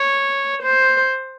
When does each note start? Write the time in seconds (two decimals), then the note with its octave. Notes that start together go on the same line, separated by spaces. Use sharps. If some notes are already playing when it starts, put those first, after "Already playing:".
Already playing: C#5
0.63 C5